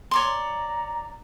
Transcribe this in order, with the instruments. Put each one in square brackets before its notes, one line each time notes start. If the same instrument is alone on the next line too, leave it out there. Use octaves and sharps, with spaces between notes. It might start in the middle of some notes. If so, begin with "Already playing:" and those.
[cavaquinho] C#5 D5 C6 [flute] A#5